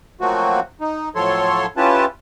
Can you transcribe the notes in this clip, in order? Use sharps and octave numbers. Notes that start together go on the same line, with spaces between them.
F3 F#3 A3 A#3 C4 F#4
D#4
A2 F3 F#3 A4 C#5 C6
C#4 E4 F4 G4 B4 A5